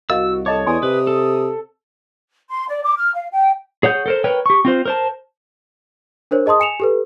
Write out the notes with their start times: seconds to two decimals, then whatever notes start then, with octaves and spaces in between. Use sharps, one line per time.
0.10 C2 F#4 A#4 D#5 F5 E6
0.46 A4 C#5 D#5 A5 D6
0.67 E2 D5 G#5 C6 D#6
0.83 C3 B4
1.07 A4
2.50 C6
2.68 D5
2.83 D6
2.97 F6
3.13 F5
3.31 G5
3.83 G#4 C#5 F#5 G6
4.06 A4 A#4 C5
4.24 A#4 B4 C#5 G5
4.46 G4 C#6
4.65 C4 F4 C5
4.86 A#4 C5 A5
6.31 D4 A#4 C5 C#5
6.46 G#4 D#5 A5 C6 D#6
6.60 G#5 C#7 E7 F7
6.80 G4 A4 B4